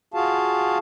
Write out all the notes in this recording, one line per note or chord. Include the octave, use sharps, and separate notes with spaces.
F4 F#4 G#4 F5 A5